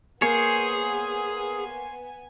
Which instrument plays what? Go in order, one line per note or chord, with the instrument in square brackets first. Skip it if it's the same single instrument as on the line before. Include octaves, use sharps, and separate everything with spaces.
[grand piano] A#3 [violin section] B3 G#5 [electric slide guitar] G#4 [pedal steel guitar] C5 C#5